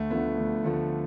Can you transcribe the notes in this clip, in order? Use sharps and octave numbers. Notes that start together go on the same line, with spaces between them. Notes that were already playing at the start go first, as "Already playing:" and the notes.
Already playing: D2 A3
D3 F3 A3 B3
D2
D3 F3 A3